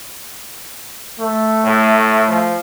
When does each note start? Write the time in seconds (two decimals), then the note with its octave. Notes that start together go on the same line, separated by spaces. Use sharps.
1.20 A3
1.65 A2
2.29 F3